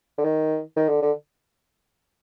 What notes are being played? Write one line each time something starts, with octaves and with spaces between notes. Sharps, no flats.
D3
D#3
D#3
D3
D3